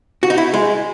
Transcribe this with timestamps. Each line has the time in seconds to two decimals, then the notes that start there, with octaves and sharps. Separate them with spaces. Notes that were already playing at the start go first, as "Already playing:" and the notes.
0.23 F#4
0.30 D#4
0.38 E4
0.54 G#3